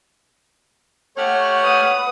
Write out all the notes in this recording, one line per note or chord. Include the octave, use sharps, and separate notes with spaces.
A3 G4 C#5 F#5 F6
B4 D#6